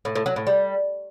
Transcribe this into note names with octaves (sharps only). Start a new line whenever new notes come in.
A2
A2
F#3
A2
G3